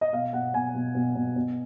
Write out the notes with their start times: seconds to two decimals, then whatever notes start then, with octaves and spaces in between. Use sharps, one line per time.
0.01 D#5
0.13 B2 F5
0.33 B2 F#5
0.54 B2 G#5
0.75 B2
0.95 B2
1.15 B2
1.36 B2